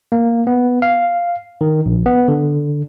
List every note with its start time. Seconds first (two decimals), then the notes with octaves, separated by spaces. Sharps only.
0.12 A#3
0.47 B3
0.82 F5
1.61 D#3
1.86 A#1
2.06 B3
2.28 D3